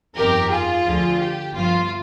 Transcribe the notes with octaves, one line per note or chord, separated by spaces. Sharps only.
G1 F2 D#3 G4 A#4
F4 G#4
D2 D3 F3
G4
G1 G2 F3 F4